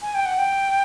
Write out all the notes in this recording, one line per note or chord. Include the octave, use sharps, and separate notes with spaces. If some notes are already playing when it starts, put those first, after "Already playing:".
G#5
G5
F#5
G5